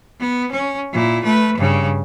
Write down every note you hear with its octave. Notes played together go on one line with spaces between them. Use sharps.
B3
C#4
A#2 E4
A3 B4
G2 C#3